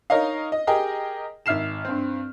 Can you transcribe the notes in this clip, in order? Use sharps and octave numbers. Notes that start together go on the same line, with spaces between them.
D#4 A#4 C#5 D#5 F5
D#5
G4 G#4 A#4 D#5 G5
G#1 E5 F6 C7 E7
G2 C4